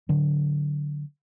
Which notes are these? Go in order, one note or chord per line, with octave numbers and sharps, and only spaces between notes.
D3 F#3